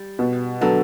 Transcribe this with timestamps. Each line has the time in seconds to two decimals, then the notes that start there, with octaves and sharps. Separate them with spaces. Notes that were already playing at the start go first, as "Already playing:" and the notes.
Already playing: G3
0.19 B2
0.61 D3 F#3 B3 F#4 A4